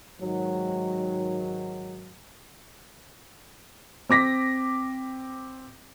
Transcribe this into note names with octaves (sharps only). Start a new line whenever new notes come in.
G#2 D#3 F#3
C4 D6 A#6 B6